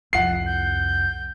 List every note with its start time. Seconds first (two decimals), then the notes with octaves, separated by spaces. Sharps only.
0.13 C2 F2 F#5 C7
0.46 G6